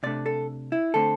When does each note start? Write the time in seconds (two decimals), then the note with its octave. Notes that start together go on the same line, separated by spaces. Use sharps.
0.03 C3 A3 D4 D5
0.26 A4
0.72 E4
0.94 D3 A3 C4 A4